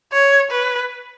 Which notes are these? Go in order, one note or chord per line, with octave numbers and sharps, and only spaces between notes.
C#5
B4